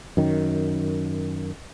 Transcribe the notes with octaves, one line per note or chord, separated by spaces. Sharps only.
F#2 D#3